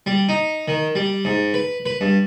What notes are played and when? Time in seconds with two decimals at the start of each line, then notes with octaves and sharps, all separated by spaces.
0.06 G3
0.29 D#4
0.68 D#3
0.95 G3
1.25 G#2
1.54 B4
1.86 B4
2.01 G2